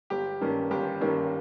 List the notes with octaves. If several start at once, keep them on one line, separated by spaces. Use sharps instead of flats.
G1 G4
G2 D#3 A#3 C#4
G1 G4
G2 D#3 A#3 C#4